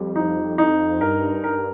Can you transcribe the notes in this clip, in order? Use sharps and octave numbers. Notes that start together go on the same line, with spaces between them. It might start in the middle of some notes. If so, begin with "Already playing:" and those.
Already playing: F2 G3
D#4
D#4
G2 A#4
A#4